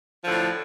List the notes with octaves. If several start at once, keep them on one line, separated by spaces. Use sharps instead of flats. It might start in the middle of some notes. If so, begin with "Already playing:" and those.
A2 D3 F3